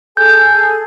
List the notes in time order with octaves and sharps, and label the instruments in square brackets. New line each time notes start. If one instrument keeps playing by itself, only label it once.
[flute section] G#4 A4 G#5 [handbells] G6